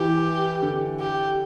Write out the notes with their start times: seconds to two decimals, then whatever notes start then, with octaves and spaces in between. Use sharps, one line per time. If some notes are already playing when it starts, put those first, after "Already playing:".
Already playing: E3 G4
0.62 D3
1.00 G4